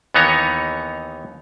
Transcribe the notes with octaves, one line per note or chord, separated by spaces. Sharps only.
D#2 E3 B3 D#4 C#5 A#5